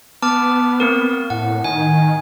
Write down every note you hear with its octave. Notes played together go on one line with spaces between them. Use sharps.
B3 A5 D6 F6
A#3 C4 A#4
A2 F#5
D#3 G#5